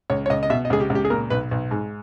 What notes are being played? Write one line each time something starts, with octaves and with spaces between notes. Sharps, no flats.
C#2 C#5
C#5
C#2 D#5
D#5
B2 E5
D#5
C#2 G#4
G4
C#2
G4
G#4
A#2 A#4
B1 B4
B1
G#2